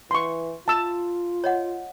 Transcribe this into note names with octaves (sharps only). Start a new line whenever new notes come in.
E3 C6 C#6
F4 A5 E6
C#5 D#5 F#5